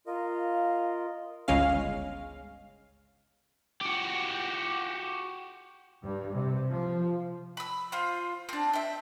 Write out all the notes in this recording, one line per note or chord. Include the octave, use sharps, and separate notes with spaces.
F4 A#4 D#5 F5
G1 C#2 G#3 C#4 F5
F#4 G4
G2
C3
F3
B5 E6
F4 C5
C4 D4
E5 G5